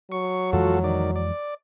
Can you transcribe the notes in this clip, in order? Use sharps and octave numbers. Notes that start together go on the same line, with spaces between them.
F#3 C#6
F2 E3 G#3 F4 F#4 A4
D#3 D5
D5